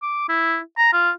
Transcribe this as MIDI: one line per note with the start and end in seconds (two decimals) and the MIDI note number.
0.02 0.27 86
0.29 0.59 64
0.78 0.93 82
0.93 1.10 65